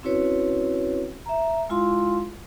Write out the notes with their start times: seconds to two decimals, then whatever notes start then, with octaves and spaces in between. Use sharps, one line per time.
0.03 C4 C#4 E4 F#4 B4 C#5
1.26 E5 A#5
1.69 G#3 E4 F4 F5 C6